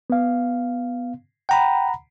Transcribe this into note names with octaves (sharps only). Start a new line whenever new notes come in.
B3 F5
F#5 G5 A#5 B5